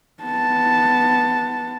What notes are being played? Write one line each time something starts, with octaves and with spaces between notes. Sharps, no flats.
B3 A5